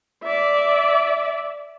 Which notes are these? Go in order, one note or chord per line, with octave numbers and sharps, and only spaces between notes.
D5 E5